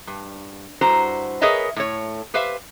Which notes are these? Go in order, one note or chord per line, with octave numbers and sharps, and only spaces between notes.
G2
G2 E4 F#4 C5 A#5
G#4 A#4 B4 C#5 D#5 E5
A2 C#5
G4 B4 C5 E5 F5